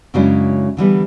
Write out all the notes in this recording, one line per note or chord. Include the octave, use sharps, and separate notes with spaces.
F#2 C#3 F#3 G#3 D4 E4
D3 E3 G3 B3